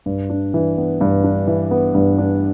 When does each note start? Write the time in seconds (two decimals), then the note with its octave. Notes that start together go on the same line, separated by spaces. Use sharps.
0.06 G2
0.30 D4
0.54 E3
0.78 B3
1.01 G2
1.24 D4
1.47 E3
1.71 B3
1.95 G2
2.18 D4